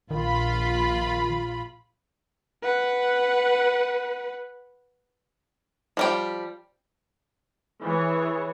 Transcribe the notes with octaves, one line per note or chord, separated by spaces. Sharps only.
A#1 D#3 F4 B5
B4 F#5
F3 G3 G4
E3 G#4 C#5